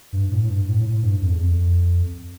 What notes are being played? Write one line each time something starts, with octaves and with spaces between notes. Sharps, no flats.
G2
A2
G2
A2
A2
A2
G2
F2
E2
F2